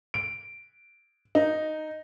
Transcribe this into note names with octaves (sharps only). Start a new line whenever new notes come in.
D7
D#4